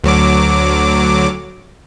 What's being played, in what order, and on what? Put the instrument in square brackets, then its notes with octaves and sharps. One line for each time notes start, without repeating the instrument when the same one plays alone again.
[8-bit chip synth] D2 F#3 D6